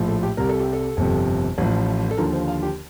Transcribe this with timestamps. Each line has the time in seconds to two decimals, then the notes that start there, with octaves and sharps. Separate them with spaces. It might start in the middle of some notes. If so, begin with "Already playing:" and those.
Already playing: A#1 A2 F3
0.08 A4
0.23 G4
0.37 C2 C3 G3 A#4
0.49 A4
0.60 G4
0.73 A4
0.97 G1 F2 C3
1.58 A1 A2 F3
2.11 A4
2.17 D#2 D3 F3 A#4
2.33 C5
2.48 F5
2.63 G4